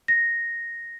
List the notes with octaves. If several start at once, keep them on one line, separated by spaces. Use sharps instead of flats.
A#6